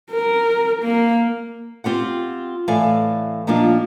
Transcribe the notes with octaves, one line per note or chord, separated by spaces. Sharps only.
A#4
A#3
C4 F4 G4 F#5
A2 E3 A4 D5 F5 G#5
A#2 F3 A#3 D4 D#4 F4